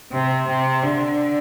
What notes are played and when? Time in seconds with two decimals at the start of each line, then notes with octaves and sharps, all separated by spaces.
0.12 C3
0.47 C3
0.83 D3